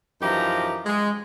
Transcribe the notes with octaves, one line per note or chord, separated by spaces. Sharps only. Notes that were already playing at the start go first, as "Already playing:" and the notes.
F#2 E3 F3 D#4 G4 A#5
G#3